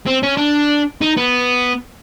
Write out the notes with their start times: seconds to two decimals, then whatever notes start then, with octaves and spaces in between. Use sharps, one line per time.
0.06 C4
0.23 C#4
0.37 D4
1.01 D#4
1.17 B3